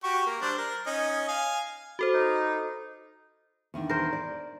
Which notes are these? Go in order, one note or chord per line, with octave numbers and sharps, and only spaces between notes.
F#4 G4 C#6
A#3
G3 D4 C5
A#4
C#4 D#4 D#5
F5 G#5
F#4 A4 C5
D#4
E2 D#3 D4
A#4 C5
D5